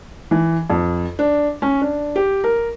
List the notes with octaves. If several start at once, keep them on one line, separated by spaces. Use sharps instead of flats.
E3
F2
D4
C#4
D4
G4
A#4